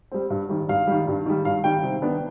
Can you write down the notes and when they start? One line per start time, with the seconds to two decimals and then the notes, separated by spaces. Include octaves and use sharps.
0.11 G3 C4
0.30 G2
0.49 D#3 G3
0.69 G2 F5
0.87 D#3 G3
1.07 G2
1.26 D#3 G3
1.45 G2 F5
1.64 D#3 G3 G5
1.83 C3
2.02 D#3 B3 D4